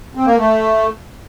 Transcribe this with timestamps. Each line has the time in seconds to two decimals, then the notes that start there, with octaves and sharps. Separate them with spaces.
0.15 C4
0.26 A#3
0.36 A3